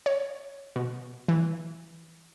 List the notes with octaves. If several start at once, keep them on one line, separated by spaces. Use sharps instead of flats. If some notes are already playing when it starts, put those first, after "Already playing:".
C#5
B2
E3